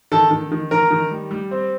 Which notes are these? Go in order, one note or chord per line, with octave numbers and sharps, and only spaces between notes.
D#3 A4 A5
D#3
D#3
D#3 A#4 A#5
D#3
G3
G3
C4